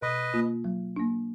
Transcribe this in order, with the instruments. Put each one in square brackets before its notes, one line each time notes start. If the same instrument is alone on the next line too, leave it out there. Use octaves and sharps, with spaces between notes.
[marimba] B2 [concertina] B4 D#5
[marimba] A#3 F4
F#3
A#3 D4